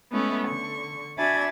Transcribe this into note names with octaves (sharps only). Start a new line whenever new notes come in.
G#3 A3 B3 C#4 E4
D3 C#6
D4 F#4 E5 G#5 B5 A6